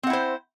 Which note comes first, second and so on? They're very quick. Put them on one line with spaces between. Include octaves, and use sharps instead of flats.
C4 F#5 E4 C5